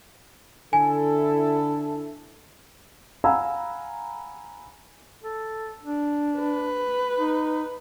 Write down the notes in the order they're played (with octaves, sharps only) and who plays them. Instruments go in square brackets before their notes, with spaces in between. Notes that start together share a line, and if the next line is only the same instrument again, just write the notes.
[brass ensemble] D3 E4 A4 [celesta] G#5
[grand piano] F5 F#5 G#5 A#5 B5 E6
[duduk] A4
D4
[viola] B4
[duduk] D#4